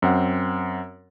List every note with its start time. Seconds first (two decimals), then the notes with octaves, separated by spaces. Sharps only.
0.02 F#2 C4 F#5